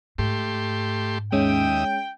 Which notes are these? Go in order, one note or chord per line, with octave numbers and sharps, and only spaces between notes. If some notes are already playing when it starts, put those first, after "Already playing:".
G#2 A3 G4 C6
D#2 G#3 C#4 E5 G5 D#6